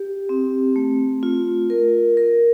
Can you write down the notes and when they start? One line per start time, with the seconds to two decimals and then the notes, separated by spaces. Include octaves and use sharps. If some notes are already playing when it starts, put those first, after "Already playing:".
Already playing: G4
0.29 C4
0.76 A3
1.23 F4
1.70 A#4
2.17 A#4